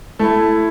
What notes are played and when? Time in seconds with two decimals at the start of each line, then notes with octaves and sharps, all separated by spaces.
0.19 A3 E4